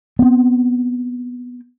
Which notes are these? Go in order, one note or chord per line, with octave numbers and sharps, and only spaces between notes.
B3 C4